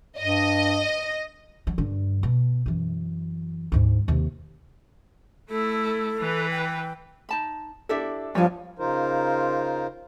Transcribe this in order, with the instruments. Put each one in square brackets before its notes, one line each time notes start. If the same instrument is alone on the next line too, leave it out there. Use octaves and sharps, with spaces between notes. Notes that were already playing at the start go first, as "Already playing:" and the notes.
[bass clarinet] G2 [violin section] D#5
[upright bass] F#3
G2 D3
B2
F#2 E3
D2 G#2
D#2 C3
[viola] A3 E4 [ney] A4
[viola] E3 B4
[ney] G5
[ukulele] D#4 A5 B5
[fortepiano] D4 A4 [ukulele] E4 G4 E5
[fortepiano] G2 [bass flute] F3 [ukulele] C#5 G#5
[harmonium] C#3 D#4 F4 A#4 C5